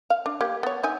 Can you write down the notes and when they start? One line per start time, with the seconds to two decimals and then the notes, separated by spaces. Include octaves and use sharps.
0.10 F5
0.26 D4
0.41 A#3 G4
0.63 B3 C#5
0.83 D#4 E5 G#5